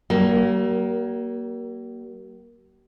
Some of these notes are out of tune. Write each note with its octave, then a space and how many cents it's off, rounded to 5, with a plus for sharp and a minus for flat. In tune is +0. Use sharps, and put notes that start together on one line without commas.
G3 -45 A#3 +15